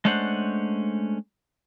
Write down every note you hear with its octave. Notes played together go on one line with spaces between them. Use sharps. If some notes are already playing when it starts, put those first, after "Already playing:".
G#3 A3 C#4 D4 C5 F#5